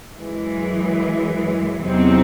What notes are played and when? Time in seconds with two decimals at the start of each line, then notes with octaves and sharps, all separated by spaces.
0.18 F#2 E3 G#3
1.84 E2 C3 F#3 C4 D#4